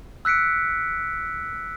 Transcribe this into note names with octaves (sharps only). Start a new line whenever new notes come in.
E6 F#6 B6 C#7 D7